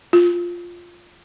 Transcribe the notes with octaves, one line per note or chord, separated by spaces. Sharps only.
F4